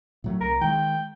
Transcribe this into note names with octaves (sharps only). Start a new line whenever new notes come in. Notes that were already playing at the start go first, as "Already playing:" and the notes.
A2 F#3 A3
C2 A#4
D#3 G#3 G5